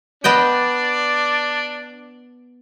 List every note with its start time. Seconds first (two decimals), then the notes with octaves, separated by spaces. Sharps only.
0.24 B3 D4 D5 D#5 G5